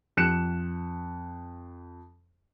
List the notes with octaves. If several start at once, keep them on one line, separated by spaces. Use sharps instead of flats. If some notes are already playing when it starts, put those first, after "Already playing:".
F2 F#6 C#7 E7